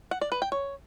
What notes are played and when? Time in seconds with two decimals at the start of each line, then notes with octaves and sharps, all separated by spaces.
0.11 F#5
0.21 D5
0.32 B4
0.42 G5
0.52 C#5